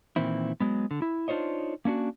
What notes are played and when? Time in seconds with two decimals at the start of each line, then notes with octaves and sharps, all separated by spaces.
0.16 A#2 D#3 E3 C4 E4
0.60 F#3 G#3 B3
0.91 D3
1.02 E4
1.28 D4 D#4 F4 C5 C#5 D#5
1.85 A#3 C#4 D4 F#4